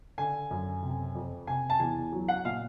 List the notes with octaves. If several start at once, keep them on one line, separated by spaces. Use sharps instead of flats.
D3 G#5
F#2
C3
F2
C3 G#5
A5
E2 G#5
F#3
F#5
A#2 F5